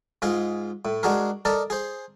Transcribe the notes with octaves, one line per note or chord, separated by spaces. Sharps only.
G#2 F4 G#4 D#5
A2
G#3 D4 F#4 G#4 A#4
A4 A#4 D5 D#5 A5
G#4 C5